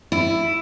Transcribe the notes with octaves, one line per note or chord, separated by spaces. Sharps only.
E4